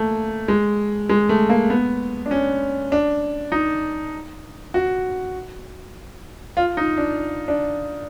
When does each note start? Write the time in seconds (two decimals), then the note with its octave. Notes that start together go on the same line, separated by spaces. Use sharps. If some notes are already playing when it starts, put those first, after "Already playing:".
Already playing: A3 A#3
0.48 G#3
1.09 G#3
1.29 A3
1.49 A#3
1.70 B3
2.26 D4
2.31 C#4
2.92 D4
3.52 D#4
4.74 F#4
6.57 F4
6.77 D#4
6.98 D4
7.48 D4